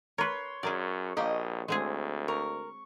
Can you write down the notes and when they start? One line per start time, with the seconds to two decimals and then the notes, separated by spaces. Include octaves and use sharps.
0.18 A#4 B4 C#5 C6
0.63 F#2 G#4 A#4 D5
1.17 A#1 A#3 G4 D#5
1.68 D2 G#3 C4 G#4
2.28 A#4 C#6